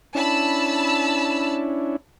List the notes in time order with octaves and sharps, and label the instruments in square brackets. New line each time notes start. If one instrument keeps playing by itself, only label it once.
[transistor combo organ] C#4 D4 E4 [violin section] A5 B5 E6